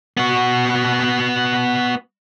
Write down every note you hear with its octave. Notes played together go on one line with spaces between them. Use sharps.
B3 F#4